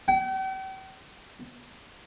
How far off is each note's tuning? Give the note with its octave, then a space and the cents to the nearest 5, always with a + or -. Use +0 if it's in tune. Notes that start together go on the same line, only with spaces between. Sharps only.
G5 -45